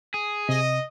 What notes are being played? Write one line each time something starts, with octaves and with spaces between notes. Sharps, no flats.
G#4
C3 D#5